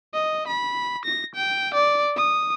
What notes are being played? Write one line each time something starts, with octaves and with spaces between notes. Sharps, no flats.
D#5
B5
A#6
G5
D5
D#6